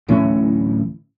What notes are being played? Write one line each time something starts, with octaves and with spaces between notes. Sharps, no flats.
D1 A2 E3 C#4